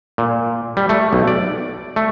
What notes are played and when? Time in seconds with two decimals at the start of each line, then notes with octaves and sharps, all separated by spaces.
0.18 A#2
0.77 G3
0.89 A3
1.13 B1
1.28 D5
1.96 A3